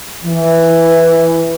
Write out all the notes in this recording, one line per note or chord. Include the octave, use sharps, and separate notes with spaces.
E3